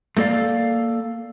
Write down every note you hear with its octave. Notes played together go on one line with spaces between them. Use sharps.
A3 A#3 A4 D5 F5